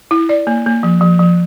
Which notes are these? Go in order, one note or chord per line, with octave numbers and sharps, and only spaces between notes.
E4
D5
A#3
A#3
F3
F3
F3